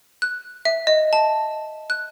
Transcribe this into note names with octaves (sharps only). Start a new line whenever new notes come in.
F#6
E5
D#5
A5
F#6